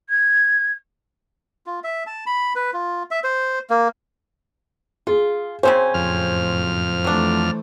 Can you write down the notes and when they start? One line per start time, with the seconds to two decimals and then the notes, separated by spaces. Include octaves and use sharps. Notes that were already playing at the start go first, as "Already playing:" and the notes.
0.10 G#6
1.66 F4
1.84 E5
2.07 A5
2.26 B5
2.56 B4
2.73 F4
3.11 E5
3.24 C5
3.70 A#3
5.07 F4 G#4
5.63 C#3 C4 C#4 C5
5.94 F#1 F2 A2 F6
7.04 E3 F#3 A3 D4